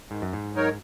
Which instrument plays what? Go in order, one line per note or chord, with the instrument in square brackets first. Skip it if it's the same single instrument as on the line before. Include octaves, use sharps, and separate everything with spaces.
[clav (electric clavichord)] G#2 [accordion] D#3
[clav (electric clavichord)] F#2
G#2
[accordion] F#3 D#4 A#4 C#5